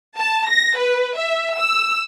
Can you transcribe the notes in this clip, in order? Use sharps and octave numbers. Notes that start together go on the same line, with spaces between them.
A5
A#6
B4
E5
E6